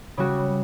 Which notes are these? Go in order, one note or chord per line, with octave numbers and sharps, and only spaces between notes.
C#3 G3 C#4 F#4